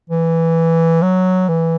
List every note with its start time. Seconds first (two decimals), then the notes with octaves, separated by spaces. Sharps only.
0.10 E3
1.02 F#3
1.48 E3